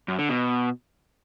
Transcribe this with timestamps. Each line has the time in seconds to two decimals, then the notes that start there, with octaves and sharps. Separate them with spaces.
0.08 F#2
0.19 D3
0.29 B2